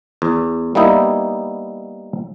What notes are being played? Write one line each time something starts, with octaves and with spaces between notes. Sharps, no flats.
E2
G3 A#3 B3 D#4 E4